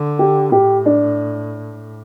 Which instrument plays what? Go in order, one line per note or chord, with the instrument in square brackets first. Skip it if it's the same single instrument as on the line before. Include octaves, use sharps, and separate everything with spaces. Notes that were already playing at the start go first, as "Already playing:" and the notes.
Already playing: [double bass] D3
[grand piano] G4
[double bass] A2 [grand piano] G4
[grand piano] D4